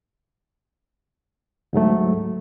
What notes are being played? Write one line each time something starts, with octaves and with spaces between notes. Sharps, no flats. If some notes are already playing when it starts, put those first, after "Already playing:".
D2 G#2 F#3 A3